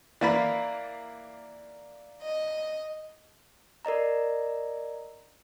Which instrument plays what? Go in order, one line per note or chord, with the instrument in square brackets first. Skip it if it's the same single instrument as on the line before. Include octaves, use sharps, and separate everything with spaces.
[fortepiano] E3 A#3 B5 [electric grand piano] D5 F5 A6
[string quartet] D#5
[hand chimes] A#4 D5 D#5 A#5